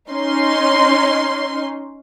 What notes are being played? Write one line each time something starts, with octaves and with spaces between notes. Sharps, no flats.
C#4 D#4 C6